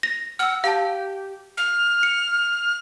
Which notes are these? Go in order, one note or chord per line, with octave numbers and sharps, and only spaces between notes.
A#6
F#5 E6 F6
G4 F5 A5
F6
C#7